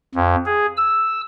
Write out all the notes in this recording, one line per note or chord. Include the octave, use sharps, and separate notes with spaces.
F2
G#4
E6